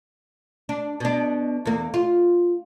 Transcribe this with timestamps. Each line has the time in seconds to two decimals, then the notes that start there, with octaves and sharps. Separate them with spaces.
0.69 D4
1.00 B2 D4
1.65 E2 A#3
1.94 F4